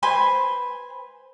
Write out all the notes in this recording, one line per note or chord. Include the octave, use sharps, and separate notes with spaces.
B4 C5 G#5 C6